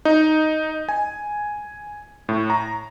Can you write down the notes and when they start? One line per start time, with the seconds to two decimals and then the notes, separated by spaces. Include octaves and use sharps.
0.05 D#4
0.89 G#5
2.29 A2
2.50 A#5